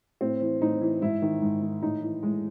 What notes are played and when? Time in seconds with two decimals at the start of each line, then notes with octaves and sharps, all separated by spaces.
0.21 A2 C4
0.41 E3
0.61 A2 D#4
0.81 E3
1.02 G#2 E4
1.22 D#3
1.42 G#2
1.62 D#3
1.82 A2 D#4
2.02 E3
2.23 A2 G#3